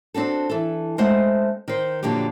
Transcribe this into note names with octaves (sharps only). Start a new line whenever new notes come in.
C4 D4 F#4 A4
E3 A4
G#3 A3 C4 C5 F#5
D#3 C5
F2 A#2 D3 F#3 G4